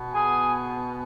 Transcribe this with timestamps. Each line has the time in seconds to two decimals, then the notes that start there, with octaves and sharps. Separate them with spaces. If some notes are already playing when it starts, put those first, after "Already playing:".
Already playing: B2 B3
0.14 G#4 G#5